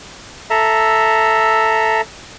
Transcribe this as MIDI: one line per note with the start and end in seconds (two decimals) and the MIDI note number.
0.50 2.01 69
0.50 2.01 76
0.50 2.01 82